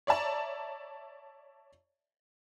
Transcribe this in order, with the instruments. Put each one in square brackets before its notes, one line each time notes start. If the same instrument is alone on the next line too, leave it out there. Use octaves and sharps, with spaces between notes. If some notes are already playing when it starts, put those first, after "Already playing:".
[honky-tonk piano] C#5 D5 E5 A5 A#5